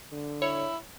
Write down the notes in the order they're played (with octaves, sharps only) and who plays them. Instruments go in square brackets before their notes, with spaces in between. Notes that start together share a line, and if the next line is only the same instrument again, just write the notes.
[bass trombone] D3
[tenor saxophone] E4 [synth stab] C#5